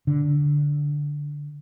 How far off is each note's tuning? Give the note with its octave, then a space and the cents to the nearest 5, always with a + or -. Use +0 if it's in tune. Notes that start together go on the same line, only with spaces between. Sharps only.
D3 -5